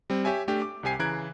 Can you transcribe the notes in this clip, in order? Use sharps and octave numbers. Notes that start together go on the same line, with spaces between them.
G3 C4
G4 C#5 E5 G#5
A3 D4 G4
D6
C2 C3 G4 G#5 C7
C#3 E3 A#5 F#6 G#6 D7